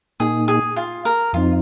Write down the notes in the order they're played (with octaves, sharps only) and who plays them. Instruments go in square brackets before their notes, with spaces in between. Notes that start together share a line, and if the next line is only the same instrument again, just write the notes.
[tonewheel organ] A#2 A#3 D#4 [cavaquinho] G#4
[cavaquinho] G#4
F4
A#4
[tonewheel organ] F2 F3 C4 D#4 [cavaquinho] F4